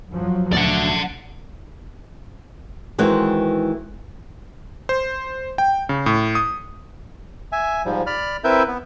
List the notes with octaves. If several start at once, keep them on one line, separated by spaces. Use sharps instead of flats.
F#2 F3 F#3
D2 A#2 D5 F#5
D#3 E3 G#3 C4 F#4
C5
G5
C#3
A2
D#6
E5 G#5
G#2 F3 G3
D5 B5 F6
C4 E4 A#4 B4 E5 G6
B3